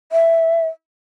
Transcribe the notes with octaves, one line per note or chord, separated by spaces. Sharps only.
E5